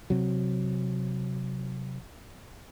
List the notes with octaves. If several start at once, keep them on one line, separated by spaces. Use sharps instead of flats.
C3 F#3